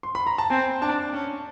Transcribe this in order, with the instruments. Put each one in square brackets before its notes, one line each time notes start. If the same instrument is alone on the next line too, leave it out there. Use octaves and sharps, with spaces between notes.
[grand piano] C6
B5
A#5
A5
[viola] C4 [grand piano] G#5
[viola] D4 [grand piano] A5
[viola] C#4